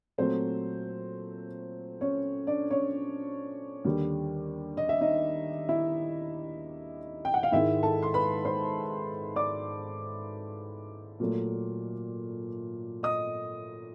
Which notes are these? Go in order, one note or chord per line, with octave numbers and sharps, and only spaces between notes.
A#2 F#3 A3 C4 C5
C#4 C#5
D4 D5
C#4 C#5
D#2 D3 G3
D#5
E5
D#4 D#5
E4 E5
G5
F#5
F5
G#2 D#3 G#3 E4 E5
A4 A5
C6
B4 B5
C5 C6
D5 D6
A#2 F#3 A3
D#5 D#6